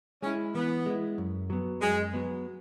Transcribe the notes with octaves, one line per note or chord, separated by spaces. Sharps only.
G#3 C#4 E4
E3 B3
G#3 E4
F#2
F#3 B3
F#2 G#3
F#3 B3